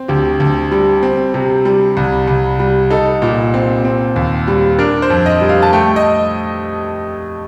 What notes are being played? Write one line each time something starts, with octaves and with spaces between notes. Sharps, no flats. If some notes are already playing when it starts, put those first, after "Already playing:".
Already playing: C4
D2 G4
D2
G3
C4
C3
G3
C2
C2
G3
D#4 A4
A#2
C4
C4
D#2
G3
D4 A#4
C5
F2
D#5
G3
F5
A5
A3 G5
D#5